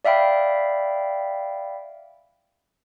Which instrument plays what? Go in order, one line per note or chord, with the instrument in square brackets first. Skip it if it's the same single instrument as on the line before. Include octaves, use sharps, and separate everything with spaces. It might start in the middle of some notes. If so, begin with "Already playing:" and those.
[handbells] D5 E5 F5 G5 B5